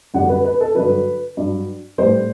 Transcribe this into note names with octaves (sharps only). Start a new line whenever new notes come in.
F#2 D3 G3 F#5
B4
B4
A4
G2 D3 F#3 B4
G2 F#3
A2 G3 C5